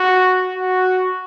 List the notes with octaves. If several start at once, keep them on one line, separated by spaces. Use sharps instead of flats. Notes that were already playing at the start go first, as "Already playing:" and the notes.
Already playing: F#4
F#4